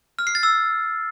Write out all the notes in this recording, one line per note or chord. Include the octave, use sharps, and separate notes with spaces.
F6
C7
A6
E6